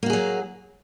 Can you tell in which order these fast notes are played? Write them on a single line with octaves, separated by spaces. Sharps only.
A#3 F#4 G#4 F#3